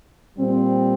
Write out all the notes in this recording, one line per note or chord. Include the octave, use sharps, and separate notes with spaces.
A#2 G3 C4